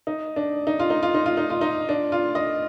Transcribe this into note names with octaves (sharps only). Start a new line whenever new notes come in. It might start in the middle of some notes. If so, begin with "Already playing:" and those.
D#4
D4
D#4
F4
D#4
F4
D#4
F4
D#4
F4
D#4
D4
F4
D#5